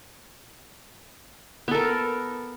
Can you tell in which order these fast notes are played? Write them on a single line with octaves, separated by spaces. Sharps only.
B3 A4 A#4